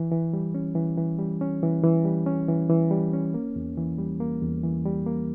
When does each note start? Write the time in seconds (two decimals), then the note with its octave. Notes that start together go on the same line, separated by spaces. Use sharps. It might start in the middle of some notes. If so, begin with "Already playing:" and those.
Already playing: E3
0.11 E3
0.33 G3
0.54 C#4
0.75 E3
0.98 E3
1.18 G3
1.41 C#4
1.63 E3
1.83 E3
2.05 G3
2.26 C#4
2.48 E3
2.70 E3
2.91 G3
3.13 C#4
3.34 A#3
3.56 E2
3.77 E3
3.99 G3
4.20 A#3
4.42 E2
4.63 E3
4.85 G3
5.06 A#3